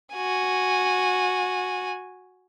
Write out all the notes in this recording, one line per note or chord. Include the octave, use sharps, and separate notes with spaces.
F#4 G#5